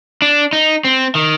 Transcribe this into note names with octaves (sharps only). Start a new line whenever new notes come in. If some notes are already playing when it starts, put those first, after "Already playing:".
D4
D#4
C4
D#3